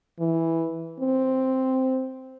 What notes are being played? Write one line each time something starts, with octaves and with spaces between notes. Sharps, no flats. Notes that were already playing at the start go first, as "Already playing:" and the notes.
E3
C4